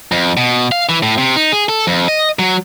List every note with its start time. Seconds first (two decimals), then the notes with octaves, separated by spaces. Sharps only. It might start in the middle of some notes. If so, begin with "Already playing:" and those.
0.12 F2
0.37 B2
0.72 F5
0.89 E3
1.03 A2
1.18 C3
1.36 D#4
1.52 G#4
1.69 A4
1.87 F2
2.08 D#5
2.39 F#3